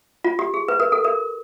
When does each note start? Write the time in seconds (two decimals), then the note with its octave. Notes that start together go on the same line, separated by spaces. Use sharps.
0.24 F4
0.39 G4
0.54 G#4
0.68 B4
0.80 A#4
0.92 A4
1.04 A#4